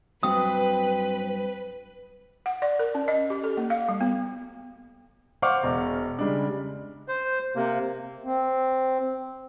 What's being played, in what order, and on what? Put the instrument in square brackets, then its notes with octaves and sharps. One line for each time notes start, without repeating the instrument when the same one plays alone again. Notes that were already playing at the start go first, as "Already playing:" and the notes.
[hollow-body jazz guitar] G2 F#3 [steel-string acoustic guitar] C4 [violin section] B4 [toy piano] D#6
[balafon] F#5
D5
A#4
C#4
D#5
G4
A4
A#3
F5
G3
B3
[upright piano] C5 F5 F#5 C#6 D6 F6
E1
C#3 G3 G#3 D4
[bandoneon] C5
C3 A#3
[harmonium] C4